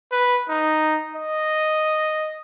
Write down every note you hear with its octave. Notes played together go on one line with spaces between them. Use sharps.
B4
D#4
D#5